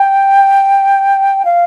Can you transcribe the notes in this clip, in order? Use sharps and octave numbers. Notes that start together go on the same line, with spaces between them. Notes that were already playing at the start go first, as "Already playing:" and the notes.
Already playing: G5
F5